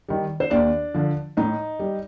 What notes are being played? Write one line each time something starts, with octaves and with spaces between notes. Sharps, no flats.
D#3 G3
C5
D#2 D4 D5
D3 F3
A2 D#4 D#5
G3